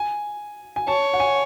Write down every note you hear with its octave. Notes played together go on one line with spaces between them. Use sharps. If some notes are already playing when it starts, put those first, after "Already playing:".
Already playing: G#5
G#5
C#5 A5
F#5
G#5